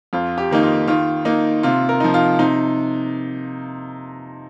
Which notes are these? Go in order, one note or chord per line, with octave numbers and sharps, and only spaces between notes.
F2 F4
G4
D#3 A#3 D#4
F4
D#3 F4
A#3 D#4
C3 F4
A#4
F3 D#4
F4
C3 D#4